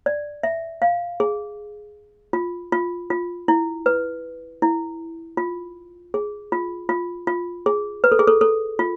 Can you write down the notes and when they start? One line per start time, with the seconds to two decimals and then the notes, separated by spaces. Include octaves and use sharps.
0.06 D5
0.43 E5
0.82 F5
1.20 G#4
2.33 F4
2.72 F4
3.10 F4
3.48 E4
3.86 B4
4.62 E4
5.37 F4
6.14 G#4
6.52 F4
6.89 F4
7.27 F4
7.66 G#4
8.04 B4
8.12 A4
8.19 G#4
8.27 A4
8.41 A4
8.79 F4